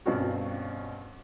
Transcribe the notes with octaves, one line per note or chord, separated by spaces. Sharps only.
G2 B2 C4 C#4 F4 F#4